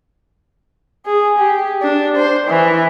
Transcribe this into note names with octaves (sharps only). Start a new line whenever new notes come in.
G#4
G4
D4
C5
E3